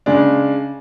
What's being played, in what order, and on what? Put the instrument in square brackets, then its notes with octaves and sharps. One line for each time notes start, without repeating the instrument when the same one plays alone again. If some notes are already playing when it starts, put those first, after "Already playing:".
[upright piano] C#3 G#3 D4